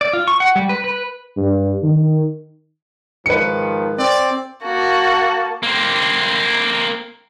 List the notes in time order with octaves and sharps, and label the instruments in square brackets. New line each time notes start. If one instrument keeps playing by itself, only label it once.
[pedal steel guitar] D5
F4
C#6
F#5
G3
B4
B4
[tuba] G2
D#3
[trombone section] G#2 D#3 F3 [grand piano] B4 C#7
[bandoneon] C4 [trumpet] D5
[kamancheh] A#3 A5 [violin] F#4
[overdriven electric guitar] A#3 C4